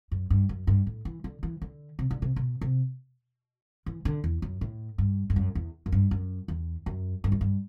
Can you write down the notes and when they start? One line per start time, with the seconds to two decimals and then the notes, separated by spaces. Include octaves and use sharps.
0.11 F#2
0.30 G2
0.49 F#2
0.67 G2
0.87 A2
1.05 E3
1.24 D3
1.43 E3
1.62 D3
1.99 C3
2.11 D3
2.22 C3
2.36 B2
2.61 C3
3.86 E3
4.05 D3
4.24 E2
4.42 F#2
4.61 A2
4.98 G2
5.30 G2
5.36 F#2
5.55 E2
5.86 F#2
5.92 G2
6.11 F#2
6.48 E2
6.86 F#2
7.24 G2
7.32 F#2
7.41 G2